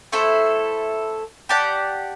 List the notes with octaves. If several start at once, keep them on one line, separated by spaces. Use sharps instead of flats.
A3 E4 A4 C5
G4 D5 F#5 A5